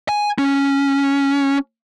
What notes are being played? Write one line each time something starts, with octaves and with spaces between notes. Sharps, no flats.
G#5
C#4